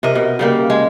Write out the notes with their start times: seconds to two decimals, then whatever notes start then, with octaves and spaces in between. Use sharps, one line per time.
0.03 C3 A#4 D#5
0.15 B2
0.39 C#3 G3 A#3
0.70 G#3